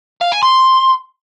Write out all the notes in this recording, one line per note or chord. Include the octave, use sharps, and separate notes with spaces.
F5
G#5
C6